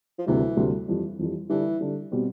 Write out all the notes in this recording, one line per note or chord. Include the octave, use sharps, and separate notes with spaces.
F3
D2 C3 E3 G3
D2 C3 G3
F2 E3 G3
F2 E3 G3
D3 E3 G3 D4
D3 G3 D4
B2 G3 C4